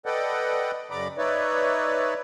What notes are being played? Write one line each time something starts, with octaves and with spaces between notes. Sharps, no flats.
A4 B4 D5 D#5 F#5 G5
F#2 C#3 D5 A#5 B5 D6
D#4 B4 C#5 D5 E5